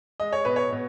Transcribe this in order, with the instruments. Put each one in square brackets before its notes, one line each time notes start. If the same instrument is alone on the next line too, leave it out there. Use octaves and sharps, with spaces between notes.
[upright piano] G#3 D#5
C#5
B2 B4
C#5
B2